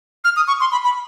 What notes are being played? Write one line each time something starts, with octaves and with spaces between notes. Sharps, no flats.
F6
D#6
C#6
C6
B5
B5